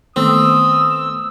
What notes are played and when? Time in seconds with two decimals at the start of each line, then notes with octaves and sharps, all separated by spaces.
0.16 D#3 A3 B3 C4 D#6 E6